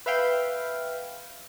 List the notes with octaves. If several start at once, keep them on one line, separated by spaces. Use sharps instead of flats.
B4 E5 F5 G5